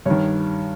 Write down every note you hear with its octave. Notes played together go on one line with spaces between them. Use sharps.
G2 D#3 C#5